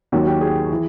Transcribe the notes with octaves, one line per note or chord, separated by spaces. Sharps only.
D#2 D#3 F#3 F#4
G4
G#4
E3